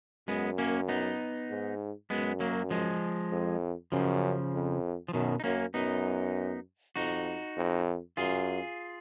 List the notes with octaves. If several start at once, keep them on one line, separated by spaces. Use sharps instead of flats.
F#2 G#3 B3
A#3 C#4
B3 D#4
G#2
F#2 G#3 B3
F#3 A#3
F3 G#3
F2
F#2 C#3 F3
F2
F3
F#2 B2 D#3
D#4
F#2 A#3 C#4
F#2 B3 D#4
F2 D#4 F#4
F2
F#2 F4 G#4